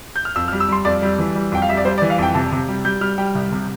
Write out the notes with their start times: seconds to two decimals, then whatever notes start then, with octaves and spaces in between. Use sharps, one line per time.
0.16 G6
0.25 F6
0.36 F2 E6
0.48 F6
0.52 G3
0.60 E6
0.69 G3 C6
0.85 F2 D5
1.02 G3
1.19 E3
1.35 G3
1.52 F2 G5
1.62 F5
1.69 G3 E5
1.77 D5
1.85 G3 C5
1.98 D5
2.02 E3
2.10 F5
2.18 F2 G5
2.34 C3 A5
2.52 C3
2.68 G3
2.85 G3 G6
3.01 G3 F6
3.18 G3 G5
3.35 C2
3.52 C3